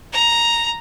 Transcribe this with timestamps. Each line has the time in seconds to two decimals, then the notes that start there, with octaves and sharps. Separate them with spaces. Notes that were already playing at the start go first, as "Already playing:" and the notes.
0.13 A#5